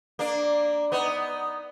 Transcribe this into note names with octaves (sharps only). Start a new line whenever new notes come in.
A#3 D4
B3 D#4